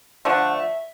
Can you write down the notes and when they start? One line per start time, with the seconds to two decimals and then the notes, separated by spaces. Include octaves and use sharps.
0.25 D3 F3 A3 D4 F#5
0.56 E5